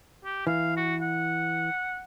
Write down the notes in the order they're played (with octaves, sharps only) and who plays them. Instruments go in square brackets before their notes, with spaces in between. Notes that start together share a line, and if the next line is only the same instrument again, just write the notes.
[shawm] G4
[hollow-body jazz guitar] E3 [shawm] F5
[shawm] F#4
F#5